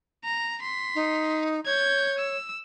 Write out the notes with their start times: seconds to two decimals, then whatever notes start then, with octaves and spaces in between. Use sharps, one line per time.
0.24 A#5
0.62 C6 B6
0.95 D#4
1.66 C#5 G6 G#6
2.18 E6